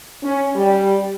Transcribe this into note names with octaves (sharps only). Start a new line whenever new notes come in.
C#4
G3